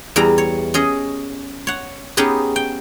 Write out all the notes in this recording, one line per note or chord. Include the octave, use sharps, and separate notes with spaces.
E2 E3 G3 A#5
C#5
C#4 G#4 D#5
C#5 F#5
B3 C#4 D#4 G4 G#4 B4
G5